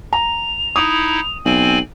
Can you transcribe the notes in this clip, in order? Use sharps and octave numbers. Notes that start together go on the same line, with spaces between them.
A#5 F7
D#4 E4 D#6
B1 C4 G#5 F#7